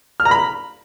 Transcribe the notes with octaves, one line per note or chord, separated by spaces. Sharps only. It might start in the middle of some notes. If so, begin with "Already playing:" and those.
F6
A#5
B5